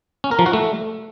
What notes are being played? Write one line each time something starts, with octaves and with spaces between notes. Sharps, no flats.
C#4
A#4
F3
F#4
A3